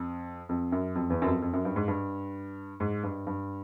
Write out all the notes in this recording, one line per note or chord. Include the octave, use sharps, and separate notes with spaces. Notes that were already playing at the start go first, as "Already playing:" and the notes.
Already playing: F2
F2
F#2
F2
E2
F#2
F2
F2
F#2
G2
G#2
G2
G#2
G2
G2